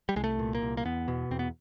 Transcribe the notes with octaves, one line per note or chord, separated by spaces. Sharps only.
G3
C2 G#3
A3
A#2
A#3
C2
A#3
E2 B3
B2
E2 C4
B3